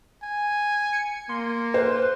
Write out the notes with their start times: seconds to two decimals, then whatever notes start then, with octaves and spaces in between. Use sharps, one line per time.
0.23 G#5
0.93 C#7
1.29 A#3 C6
1.74 B4 C5